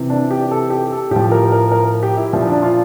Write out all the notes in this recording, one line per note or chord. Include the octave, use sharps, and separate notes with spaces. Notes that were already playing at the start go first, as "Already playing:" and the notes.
Already playing: C3 E3
D4
G4
A4
G4
A4
A2 F3 G4
A#4
A#4
A#4
G4
E4
A#2 F3 E4
D4
F4